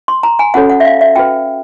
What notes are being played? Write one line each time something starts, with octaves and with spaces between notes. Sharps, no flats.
C6
A#5
G#5
C#4 F#4 A4 C#5 F#5
F#5
E5
F5
E5
F#4 B4 G5